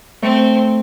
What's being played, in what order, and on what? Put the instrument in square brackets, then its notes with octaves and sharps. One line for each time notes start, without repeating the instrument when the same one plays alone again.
[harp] A3 [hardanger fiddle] C4